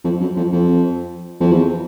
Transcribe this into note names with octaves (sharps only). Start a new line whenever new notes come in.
F2
F#2
F2
F2
F2
E2